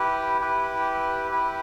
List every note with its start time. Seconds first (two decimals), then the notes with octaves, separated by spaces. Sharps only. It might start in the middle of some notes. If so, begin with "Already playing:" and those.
Already playing: E4 G4 B4
0.41 E4 G4 B4
1.31 E4 G4 B4